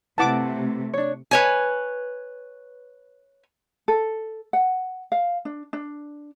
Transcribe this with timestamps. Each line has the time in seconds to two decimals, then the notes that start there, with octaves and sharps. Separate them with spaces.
0.18 C3 A3 E4 B4 F#5 A5 D6
0.94 D4 C#5
1.31 B4 C#5 G#5
3.88 A4
4.53 F#5
5.12 F5
5.45 D4
5.73 D4